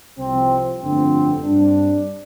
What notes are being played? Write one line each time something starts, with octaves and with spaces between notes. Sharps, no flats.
C2 C3 F3 C4
G1 F2 D3 A3 C4
G2 G3 C4 D4